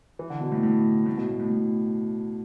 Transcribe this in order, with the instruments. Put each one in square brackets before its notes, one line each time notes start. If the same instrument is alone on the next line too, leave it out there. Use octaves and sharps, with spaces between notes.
[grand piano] E3
D3
B2
A2
A2
A2
B2
A2
A2
A2